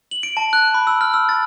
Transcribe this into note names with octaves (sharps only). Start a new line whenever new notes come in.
F#7
D7
A5
F#6
B5
E6
F6
E6
A6